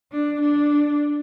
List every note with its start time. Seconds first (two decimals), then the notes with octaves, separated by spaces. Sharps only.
0.12 D4
0.42 D4